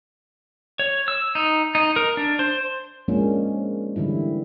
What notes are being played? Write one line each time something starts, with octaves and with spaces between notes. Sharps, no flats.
C#5
E6
D#4
D#4
A#4
D4
C5
F3 G#3 A#3 C#4 D4
D3 E3 G3 E4